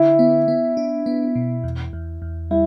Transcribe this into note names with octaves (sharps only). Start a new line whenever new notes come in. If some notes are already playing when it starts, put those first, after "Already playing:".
Already playing: D3 E4
B3
B3
D4
B3
B2
E2
E2
E2
G3 E4